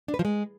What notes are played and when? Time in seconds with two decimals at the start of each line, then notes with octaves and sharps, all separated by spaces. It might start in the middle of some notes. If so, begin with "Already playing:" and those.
0.08 D4
0.14 B4
0.19 F3
0.25 G#3